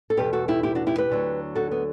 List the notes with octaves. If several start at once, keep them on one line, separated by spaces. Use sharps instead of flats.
A4
E2 B2 G3 G4 B4
F#4 A4
E4 G4
E4 G4
D4 F#4
E4 G4
G4 B4
D2 D3 F#3
F#4 A4
B3